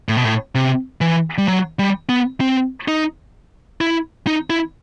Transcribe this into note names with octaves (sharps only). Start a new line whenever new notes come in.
A2
B2
A2
C3
E3
G3
F#3
G3
B3
C4
D#4
E4
D#4
E4